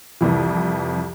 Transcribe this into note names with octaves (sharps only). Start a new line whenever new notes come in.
C2 F2 E3